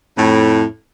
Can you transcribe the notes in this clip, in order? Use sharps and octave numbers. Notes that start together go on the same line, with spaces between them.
F2 A2